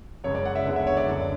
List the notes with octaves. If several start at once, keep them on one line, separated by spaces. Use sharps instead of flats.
F#1 F#2 C#3 G#3 C#5
D5
F#5
E5
D2 D3 G#3 B3 F#5
E5
C#5
D5
F#1 F#2 D3